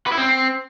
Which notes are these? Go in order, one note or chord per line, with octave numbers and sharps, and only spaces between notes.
B4
E4
C4